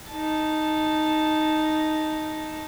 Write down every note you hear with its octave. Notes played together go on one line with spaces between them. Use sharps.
D#4 A5